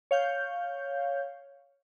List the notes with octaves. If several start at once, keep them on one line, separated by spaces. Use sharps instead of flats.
C#5 F5 G6